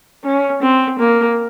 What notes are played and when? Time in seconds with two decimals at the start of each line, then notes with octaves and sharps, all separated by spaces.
0.24 C#4
0.62 C4
0.98 A#3